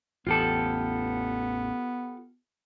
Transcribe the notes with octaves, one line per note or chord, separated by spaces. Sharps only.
A1 E2 B3 F4 G4 A4